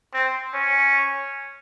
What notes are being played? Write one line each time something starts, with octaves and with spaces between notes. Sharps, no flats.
C4
C#4